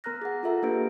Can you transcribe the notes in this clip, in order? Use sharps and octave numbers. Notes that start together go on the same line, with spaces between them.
B3 A#4 A#5 F6 F#6 A#6
G#4 F#5
F4 A4 E5 A#5
A#3 D4 G4 B4 D7